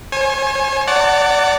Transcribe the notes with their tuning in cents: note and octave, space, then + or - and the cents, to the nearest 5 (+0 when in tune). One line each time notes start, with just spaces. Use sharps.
C#5 -45 G#5 +15
D5 -20 F#5 +15 A5 +40